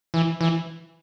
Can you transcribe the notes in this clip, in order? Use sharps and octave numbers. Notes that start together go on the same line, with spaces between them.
E3
E3